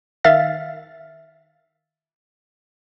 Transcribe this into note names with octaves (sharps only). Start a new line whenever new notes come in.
D#3 E5 F5 F6 A6